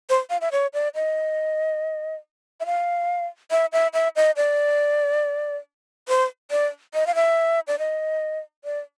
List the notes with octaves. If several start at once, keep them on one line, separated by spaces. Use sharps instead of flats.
C5
F5
E5
C#5
D5
D#5
E5
F5
E5
E5
E5
D#5
D5
C5
D5
D#5
F5
E5
D5
D#5
D5